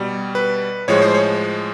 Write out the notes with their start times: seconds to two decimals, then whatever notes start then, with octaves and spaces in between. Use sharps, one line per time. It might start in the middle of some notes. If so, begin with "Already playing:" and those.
Already playing: B2 G3
0.35 B4
0.88 A2 F3 G#3 C#5
1.02 C5
1.14 C#5